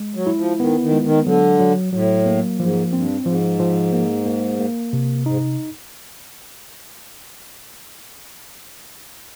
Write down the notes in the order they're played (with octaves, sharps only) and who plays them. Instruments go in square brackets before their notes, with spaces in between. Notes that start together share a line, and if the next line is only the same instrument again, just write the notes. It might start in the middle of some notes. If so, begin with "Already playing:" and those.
Already playing: [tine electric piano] G#3
[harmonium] F#3
[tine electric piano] E4
[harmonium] F3
[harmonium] D#3 [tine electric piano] B3
[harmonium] D#3
[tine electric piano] G#3
[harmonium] D#3
[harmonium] D3 [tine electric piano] F#3
[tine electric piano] F#3
[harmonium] A2 [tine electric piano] F#3
[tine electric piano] A#3
[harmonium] G#2 [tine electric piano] F3
[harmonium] G#2
[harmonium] G2 [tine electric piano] C4
[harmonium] A2
[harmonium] G#2 [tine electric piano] F3
[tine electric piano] F3
A#3
A#3
A#3
C3
[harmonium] G#2 [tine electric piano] D#4